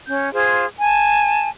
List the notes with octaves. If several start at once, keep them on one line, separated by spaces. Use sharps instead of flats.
C#4 G6
F4 G#4 C5
G#5 A5